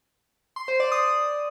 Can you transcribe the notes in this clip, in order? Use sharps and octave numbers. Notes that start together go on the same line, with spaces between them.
C6
C5
D5
D#6